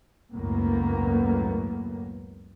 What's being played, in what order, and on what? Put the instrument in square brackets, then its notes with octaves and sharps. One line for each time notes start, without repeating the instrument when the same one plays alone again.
[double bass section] C#2 F#2 A2 A#3 B3